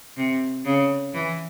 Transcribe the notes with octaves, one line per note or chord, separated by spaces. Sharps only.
C3
C#3
E3